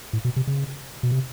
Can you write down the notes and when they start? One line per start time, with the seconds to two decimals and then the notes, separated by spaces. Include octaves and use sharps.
0.13 A2
0.25 B2
0.36 C3
0.47 C#3
1.03 B2
1.11 C3